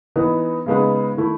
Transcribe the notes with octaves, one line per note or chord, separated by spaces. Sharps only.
E3 B3 D#4
C#3 G#3 B3 D#4
D#3 A3 E4